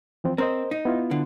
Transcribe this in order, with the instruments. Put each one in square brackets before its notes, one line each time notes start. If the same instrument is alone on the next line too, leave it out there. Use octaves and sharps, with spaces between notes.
[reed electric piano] E3 F3 C4
[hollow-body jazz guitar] C4 [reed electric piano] A#4 C5 D#5
[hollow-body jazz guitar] D#4
[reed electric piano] B3 E4 F4
[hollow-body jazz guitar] D3